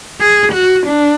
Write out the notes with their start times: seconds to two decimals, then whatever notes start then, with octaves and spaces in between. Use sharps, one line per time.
0.21 G#4
0.53 F#4
0.87 D4